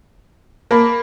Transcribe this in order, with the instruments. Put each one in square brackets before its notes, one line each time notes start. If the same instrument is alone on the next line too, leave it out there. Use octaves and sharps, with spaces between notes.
[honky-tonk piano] A#3 [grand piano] A#4 A5 B5